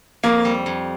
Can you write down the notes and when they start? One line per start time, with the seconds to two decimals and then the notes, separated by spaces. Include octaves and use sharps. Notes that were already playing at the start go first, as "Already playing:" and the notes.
0.23 F2 A#3
0.45 G3
0.66 F2